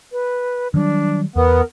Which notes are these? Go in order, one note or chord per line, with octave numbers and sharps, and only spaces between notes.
B4
D#3 F#3 G3 D4
E2 B3 A#4